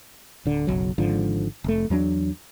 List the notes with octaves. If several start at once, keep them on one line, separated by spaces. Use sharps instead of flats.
D1 D3
F#1 B1 F#3
G#1 G#2 D3 F3
F1 A3
E2 F#3 A3 D4